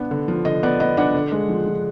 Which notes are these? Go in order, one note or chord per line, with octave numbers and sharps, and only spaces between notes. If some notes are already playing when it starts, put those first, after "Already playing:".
Already playing: B3 D4
D3
F3
D3 D#5
B3 D5
B3 D#5
D4 F#5
D3
G#3
F3
F3